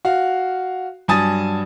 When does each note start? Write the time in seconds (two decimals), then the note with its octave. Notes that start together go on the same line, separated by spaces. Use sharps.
0.05 F#4 F5
1.08 G2 F#3 G#5 A5 D#6 A6